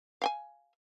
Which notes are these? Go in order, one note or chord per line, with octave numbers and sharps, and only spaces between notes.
F5 G5 G#5